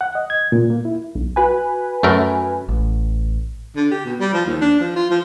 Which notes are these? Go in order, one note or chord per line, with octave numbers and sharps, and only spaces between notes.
F#5
D#5
G#6
A#2
A#3
E4
B1
F#4 B4 G#5
F#2 A3 A#4
A1
D3
G4
B2
G3
F3
D#2
D4
F3
F4
F3